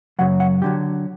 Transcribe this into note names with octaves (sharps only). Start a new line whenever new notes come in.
F#2 C#3 F#3 F#5
F#5
D3 F#3 G4